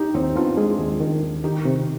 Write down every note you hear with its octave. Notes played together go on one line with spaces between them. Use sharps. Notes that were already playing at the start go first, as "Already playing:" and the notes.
Already playing: D#4 G4
D#2 C4 D#4
B3 D4 F4
G#3 F4 G#4
D#2
D#3
D#2
D#3 D#4 G4
C3